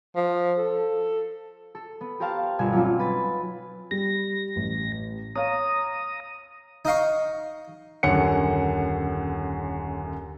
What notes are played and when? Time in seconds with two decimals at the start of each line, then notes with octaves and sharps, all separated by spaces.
0.16 F3
0.58 A4
1.75 A4
2.01 B3
2.20 G4 A#4 C5 F5 A5
2.59 G1 B2 F4 G#5 E7
2.73 F#3 A#3 C4 C#4 D#4 F4
2.99 B4 A6
3.91 G3 A#6
4.56 A1
5.36 C#5 F5 A#5 D#6
6.85 D#4 D#5 F5 C#6
8.03 D#1 F#2 D3 C#5 F#5 C#7